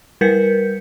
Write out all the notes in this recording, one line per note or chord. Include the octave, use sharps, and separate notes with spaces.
G3 A#4 B4 G6 B6 C#7